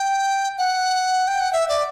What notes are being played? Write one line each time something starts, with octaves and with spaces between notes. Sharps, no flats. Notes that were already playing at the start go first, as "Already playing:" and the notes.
Already playing: G5
F#5
G5
F#5
E5
D5